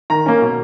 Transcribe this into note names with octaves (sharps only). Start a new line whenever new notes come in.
D#3 A#5
A#3 C#4
B2